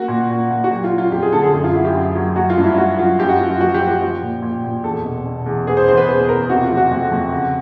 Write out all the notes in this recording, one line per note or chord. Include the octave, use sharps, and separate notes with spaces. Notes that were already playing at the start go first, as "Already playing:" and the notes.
Already playing: A#3 F#4
A#2
A#2
A#2
F#4
F#3 G4
F4
F#3
F4
F2 G4
G#4
D3 A4
G#4
F#2 G#4
F4
F#3 E4
G4
F#2
F#3
F#3 F#4
F4
G2
E4
G2 F#4
F#3 F4
F#2 G4
F#4
F#2 F4
F4
F3 F#4
G4
F3
G4
F3
A#2
A#2
A#2
E2 A4
B2
B2
E2
B3 G#4
C5
E2 C5
B4
B2 C5
B4
E2 A#4
C3 F#4
F4
F3
F#4
F2
F2
C#3